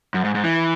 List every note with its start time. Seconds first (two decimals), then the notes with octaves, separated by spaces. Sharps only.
0.14 F#2
0.24 G#2
0.35 G#2
0.44 E3